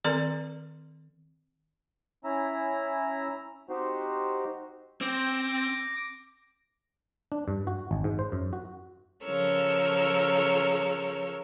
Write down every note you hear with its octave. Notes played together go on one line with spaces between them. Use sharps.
D#3 C4 A4 A#4 D5 A#5
C#4 E4 E5 A#5
C4 D#4 F#4 G4 C5
C4 D6 A#6
D4
G2
F#4
G#1
G#2
C5
F#2
F#4
C#3 F3 A4 A#4 C#5 E6